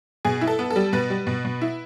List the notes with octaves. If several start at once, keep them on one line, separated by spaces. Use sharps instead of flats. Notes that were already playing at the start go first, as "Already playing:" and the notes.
B2 G#4
E4
A4
B3
A4
G3
B2 B4
G3
B2
B2
E4